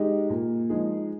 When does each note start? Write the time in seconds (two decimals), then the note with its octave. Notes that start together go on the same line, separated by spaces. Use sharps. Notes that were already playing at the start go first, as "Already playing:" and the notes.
Already playing: G#3 D#4 G4
0.30 A#2
0.69 F3 G#3 D#4 G#4